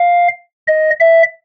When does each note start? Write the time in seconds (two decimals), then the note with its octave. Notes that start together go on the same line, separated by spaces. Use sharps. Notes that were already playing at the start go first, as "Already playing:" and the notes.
Already playing: F5
0.68 D#5
1.00 E5